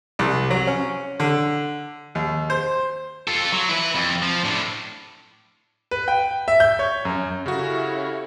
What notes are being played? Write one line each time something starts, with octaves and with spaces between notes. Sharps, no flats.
C2
F#3
C#4
D3
D#2
C5
F4 A4
F#3
E4 B4
F2
F3
A2 D4
B4
G5
E5
G6
C#5
F#2
C#3 C#4 E4 F#4 G4 A4 C#5 F5